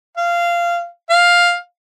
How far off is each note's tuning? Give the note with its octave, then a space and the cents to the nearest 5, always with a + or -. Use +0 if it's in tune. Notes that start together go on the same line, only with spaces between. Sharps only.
F5 -15
F5 +5